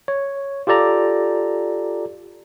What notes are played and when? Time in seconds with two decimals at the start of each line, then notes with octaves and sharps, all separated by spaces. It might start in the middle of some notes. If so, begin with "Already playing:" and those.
0.08 C#5
0.67 F4 G4 A4 D5 A#5